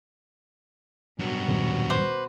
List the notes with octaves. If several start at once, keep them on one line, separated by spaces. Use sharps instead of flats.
G2 B2 F#3 F#4
D#1
B4 C5 D6